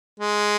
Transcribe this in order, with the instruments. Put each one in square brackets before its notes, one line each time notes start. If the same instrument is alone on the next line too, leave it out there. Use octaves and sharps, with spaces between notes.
[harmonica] G#3